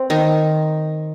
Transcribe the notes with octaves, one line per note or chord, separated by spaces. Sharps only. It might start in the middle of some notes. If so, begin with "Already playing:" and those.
Already playing: C4
D#3 D#4